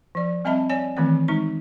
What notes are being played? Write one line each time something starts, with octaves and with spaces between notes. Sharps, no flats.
F3 D5
G3 C4 D#5 E5 A5 B5
C#5 D5 G#5
D#3 E3 A3 C4 C#5
G#3 D#4 C#6